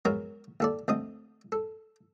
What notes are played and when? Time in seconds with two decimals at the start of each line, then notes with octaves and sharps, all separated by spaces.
0.05 F#3 G#3 B3 F#4 A#4
0.60 D#2 A4 D5
0.88 D2 C4 D#5 D#6
1.52 A4